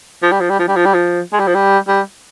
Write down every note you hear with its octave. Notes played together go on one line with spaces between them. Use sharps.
F3
G3
F3
G3
F3
G3
F3
G3
F3
G#3
G3
F3
G3
G3